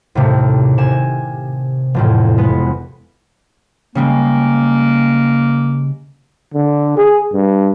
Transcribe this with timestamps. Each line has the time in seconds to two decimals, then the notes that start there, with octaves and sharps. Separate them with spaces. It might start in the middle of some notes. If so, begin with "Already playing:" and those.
0.15 D#2 A2 C3 A3
0.78 C3 G#5 E7
1.94 E1 F2 A2
2.38 G#3 B3 B4
3.95 C#3 G3 G#3 A#3
6.54 D3
6.97 G#4
7.33 G2